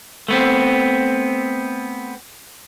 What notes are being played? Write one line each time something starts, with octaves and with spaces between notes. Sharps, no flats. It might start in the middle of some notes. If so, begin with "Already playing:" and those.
A3 B3 C4